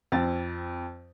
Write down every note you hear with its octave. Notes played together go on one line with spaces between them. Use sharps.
F2 C4 A6